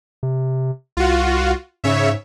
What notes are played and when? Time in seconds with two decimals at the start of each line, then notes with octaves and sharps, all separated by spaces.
0.23 C3
0.97 C2 F4 F#4
1.84 G#2 C#3 C#5 E5